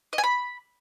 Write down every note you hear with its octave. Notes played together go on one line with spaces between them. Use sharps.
D#5
G#5
B5